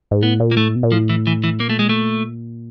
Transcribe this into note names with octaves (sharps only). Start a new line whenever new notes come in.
G#2
A2 B3
A#2
A#3
A2 A3
B2
A#2
A2 F3
E3
E3
E3
A#2 A#3
A3
G#3
A3